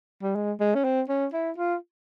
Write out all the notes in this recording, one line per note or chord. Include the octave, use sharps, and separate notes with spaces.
G3
G#3
G#3
C#4
C4
C#4
E4
F4